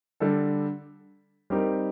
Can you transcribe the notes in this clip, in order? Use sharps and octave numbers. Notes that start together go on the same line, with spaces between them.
D3 G3 D4 A4
G3 C4 D#4 G4 A#4